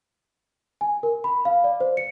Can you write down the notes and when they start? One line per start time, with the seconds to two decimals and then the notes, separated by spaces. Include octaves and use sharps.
0.81 G#5
1.03 A#4
1.24 B5
1.45 F5
1.64 D5
1.80 C5
1.97 C#7